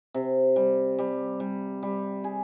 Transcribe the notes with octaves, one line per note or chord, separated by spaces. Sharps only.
C3
G3
G3
G3
G3
G#4